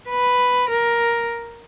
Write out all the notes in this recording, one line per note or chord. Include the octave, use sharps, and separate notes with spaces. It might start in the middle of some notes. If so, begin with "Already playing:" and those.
B4
A#4